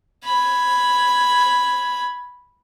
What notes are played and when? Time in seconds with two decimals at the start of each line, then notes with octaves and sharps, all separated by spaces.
0.24 B5 G#6